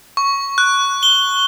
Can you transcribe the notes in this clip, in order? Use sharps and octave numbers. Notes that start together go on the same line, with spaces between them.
C#6
F#6
G7